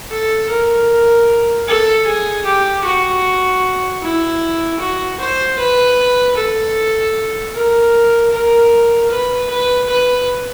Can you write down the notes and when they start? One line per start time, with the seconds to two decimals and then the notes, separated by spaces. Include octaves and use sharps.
0.10 A4
0.49 A#4
1.67 A4
2.06 G#4
2.45 G4
2.84 F#4
4.02 E4
4.80 F#4
5.20 C5
5.58 B4
6.37 A4
7.55 A#4
8.32 A#4
9.10 B4
9.50 B4
9.89 B4